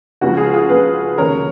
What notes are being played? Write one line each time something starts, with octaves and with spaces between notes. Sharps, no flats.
C#2 C#3 F3 F#4
F4 G#4
F4 G#4
C#2 C#3 F3 G#4 B4
F1 D#2 C#3 F#3 A#4 C#5